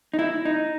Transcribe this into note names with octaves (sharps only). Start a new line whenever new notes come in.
D#4
E4
D#4